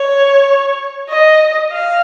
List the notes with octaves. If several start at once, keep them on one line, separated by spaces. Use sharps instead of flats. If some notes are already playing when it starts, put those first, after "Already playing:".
Already playing: C#5
D#5
F5